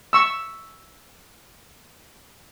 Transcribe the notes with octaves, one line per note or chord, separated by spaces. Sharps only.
C#6 E6